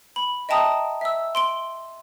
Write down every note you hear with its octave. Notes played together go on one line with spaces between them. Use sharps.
B5
D#5 E5 G5 A5 A#5 D#6
E5 E6
C6 D7 G7